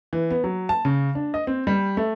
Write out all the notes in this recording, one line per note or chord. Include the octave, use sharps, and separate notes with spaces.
E3
B3
F#3
A5
C#3
D4
D#5
C4
G3
A3